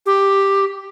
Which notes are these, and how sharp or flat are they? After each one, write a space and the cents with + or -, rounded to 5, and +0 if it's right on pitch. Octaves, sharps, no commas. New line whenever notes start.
G4 +5